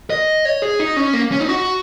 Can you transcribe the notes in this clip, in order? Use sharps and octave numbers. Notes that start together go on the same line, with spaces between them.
D#5
C#5
G#4
D#4
C#4
A#3
C#4
D#4
F#4